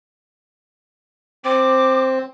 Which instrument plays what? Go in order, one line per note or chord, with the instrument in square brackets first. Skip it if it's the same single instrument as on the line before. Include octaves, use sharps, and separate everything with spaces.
[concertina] C4 [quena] D6